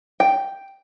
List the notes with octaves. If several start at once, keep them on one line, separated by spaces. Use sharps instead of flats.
G5